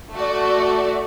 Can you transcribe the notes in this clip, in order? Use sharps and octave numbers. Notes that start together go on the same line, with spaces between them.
A3 F#4 D5